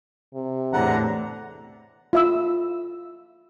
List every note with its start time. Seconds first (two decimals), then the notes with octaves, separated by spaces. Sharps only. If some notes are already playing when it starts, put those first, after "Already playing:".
0.34 C3
0.73 E2 A2 D3 F#5 A#5
2.13 F4 E5 E6